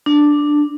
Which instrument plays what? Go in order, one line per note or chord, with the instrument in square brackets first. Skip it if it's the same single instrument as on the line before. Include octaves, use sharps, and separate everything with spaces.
[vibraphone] D4